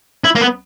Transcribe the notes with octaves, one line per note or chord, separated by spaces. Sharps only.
E4
A#3
B3